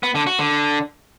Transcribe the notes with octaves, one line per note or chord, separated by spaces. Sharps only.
B3
D3
F#4
D3